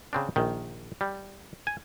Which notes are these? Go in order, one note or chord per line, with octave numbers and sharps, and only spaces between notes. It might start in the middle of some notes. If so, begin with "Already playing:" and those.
C#3 C4 D4
A#1 D#3
G3
G#5